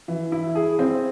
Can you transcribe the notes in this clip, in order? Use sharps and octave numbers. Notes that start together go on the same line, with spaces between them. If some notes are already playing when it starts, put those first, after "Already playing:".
E3
E4
G#4
C4